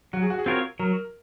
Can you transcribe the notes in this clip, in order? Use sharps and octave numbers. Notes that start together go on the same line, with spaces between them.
F#3 F#4
G#4
F#4
G#4
C4 F4 F#4 A#4 C#5
F#3 A#4